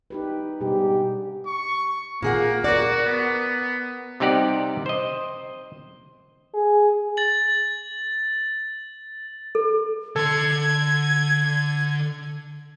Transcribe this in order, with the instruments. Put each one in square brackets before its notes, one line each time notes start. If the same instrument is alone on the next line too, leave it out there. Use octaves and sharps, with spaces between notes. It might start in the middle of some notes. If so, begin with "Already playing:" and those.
[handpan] D#4 G4 B4
[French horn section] G#2 G4 [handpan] B2 G3 D4
[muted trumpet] C#6
[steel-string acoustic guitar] A#2 G#4 F#5 [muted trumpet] A#3
[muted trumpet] F#4 [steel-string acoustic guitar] A#4 D5
[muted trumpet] B3
[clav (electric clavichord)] C3 G3 D#4 G4 D5 F#5
C5 D#5
[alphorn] G#4
[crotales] A6 F#7
[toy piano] A4
[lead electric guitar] D3 C6 [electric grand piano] A4 [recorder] G#6